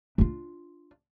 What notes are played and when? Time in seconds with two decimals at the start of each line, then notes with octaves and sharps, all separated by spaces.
0.18 D4 F4